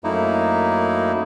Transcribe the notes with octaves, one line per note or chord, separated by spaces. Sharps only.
F#2 A3 A#3 D#4 E4